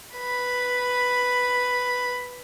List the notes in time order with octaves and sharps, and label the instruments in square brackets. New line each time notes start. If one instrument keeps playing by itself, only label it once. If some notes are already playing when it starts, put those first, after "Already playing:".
[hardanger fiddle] B4 B5